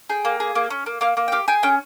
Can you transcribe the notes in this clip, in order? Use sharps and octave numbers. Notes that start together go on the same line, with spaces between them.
G#4 G5
A#3
G#4
A#3
C#4
A#3
A#3 F5
A#3
G5
G4 F5
G#4 G5
C#4 G5